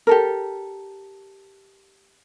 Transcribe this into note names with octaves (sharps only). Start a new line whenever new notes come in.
G4 A4 A#4